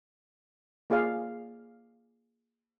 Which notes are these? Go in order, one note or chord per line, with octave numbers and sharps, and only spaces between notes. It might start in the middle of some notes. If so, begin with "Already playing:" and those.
A#3 F4 G#4 D5 F5